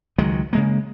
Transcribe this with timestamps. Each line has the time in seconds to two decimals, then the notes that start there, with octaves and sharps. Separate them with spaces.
0.18 C#2 D#3 F#3 G#3
0.53 C#3 G#3 A#3